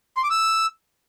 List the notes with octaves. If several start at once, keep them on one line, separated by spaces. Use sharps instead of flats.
C6
D6
E6